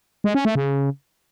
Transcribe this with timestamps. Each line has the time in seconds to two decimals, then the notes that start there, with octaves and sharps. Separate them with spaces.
0.24 G#3
0.35 C#4
0.45 A3
0.55 C#3